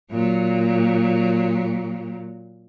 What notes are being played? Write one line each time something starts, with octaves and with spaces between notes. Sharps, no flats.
A#2 F#3